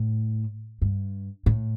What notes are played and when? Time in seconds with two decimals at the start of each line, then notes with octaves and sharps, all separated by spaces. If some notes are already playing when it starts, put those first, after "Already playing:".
Already playing: A2
0.82 G2
1.46 A2